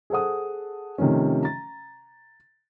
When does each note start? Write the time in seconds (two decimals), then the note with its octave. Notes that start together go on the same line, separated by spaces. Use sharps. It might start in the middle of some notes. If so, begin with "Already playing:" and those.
0.10 G#4 A4 C5 F#5 D#6
0.98 C3 D#3 F3 A3 C#4
1.43 A#5 A6